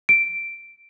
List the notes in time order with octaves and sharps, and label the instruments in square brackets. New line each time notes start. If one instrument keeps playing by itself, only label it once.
[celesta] D7